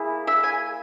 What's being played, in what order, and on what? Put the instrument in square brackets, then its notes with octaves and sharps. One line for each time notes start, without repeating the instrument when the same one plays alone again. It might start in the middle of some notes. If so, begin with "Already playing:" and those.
Already playing: [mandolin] A#3 E4 G#4
E5
G#5